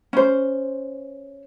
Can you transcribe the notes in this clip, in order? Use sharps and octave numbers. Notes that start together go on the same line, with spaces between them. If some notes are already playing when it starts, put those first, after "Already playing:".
C#4 C5